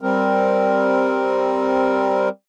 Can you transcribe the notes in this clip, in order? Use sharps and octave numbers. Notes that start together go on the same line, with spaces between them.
G3 C4 A#4